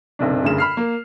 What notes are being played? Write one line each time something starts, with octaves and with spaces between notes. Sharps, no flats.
F#1 B1 C3 D4
F#1 D2 G2 C#3 E7
B5 F6 C7
A#3